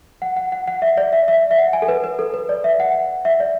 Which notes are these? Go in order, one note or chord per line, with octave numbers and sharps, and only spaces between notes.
F#5
F#5
F#5
F#5
E5
D5
E5
E5
E5
F#5
G#5
A4
B4
B4
A4
B4
D5
E5
F#5
E5
D5